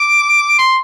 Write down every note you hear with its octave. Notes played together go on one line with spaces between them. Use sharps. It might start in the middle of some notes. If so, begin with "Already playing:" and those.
Already playing: D6
C6